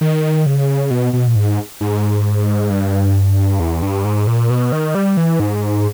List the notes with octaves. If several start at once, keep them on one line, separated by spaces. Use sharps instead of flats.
D#3
C#3
B2
B2
A#2
G#2
G#2
G2
E2
G2
G#2
A#2
B2
D#3
G3
E3
G#2